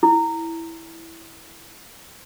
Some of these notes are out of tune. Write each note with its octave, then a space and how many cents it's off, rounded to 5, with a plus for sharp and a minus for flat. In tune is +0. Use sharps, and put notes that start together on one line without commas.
E4 +0